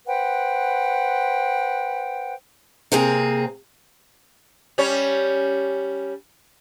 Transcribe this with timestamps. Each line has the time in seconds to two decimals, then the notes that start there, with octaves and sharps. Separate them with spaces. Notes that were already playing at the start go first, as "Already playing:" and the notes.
0.06 B4 C5 F#5 G5
2.92 C3 A#3 C4 G#4
4.78 G3 C#4 C#5